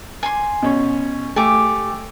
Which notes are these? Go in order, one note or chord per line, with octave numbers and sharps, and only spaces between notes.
G#5 C6
B2 C#4
A3 G4 G#5